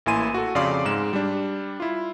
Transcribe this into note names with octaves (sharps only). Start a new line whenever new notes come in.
A1 A#3 E4 G#5 C6 D#7
F#4 A4
F2 C#3 D5 F5 C6 D6
G#2 G#3 E7
G3 D4
E4 F4